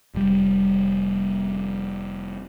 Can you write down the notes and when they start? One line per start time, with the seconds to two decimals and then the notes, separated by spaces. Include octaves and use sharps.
0.15 F1 G3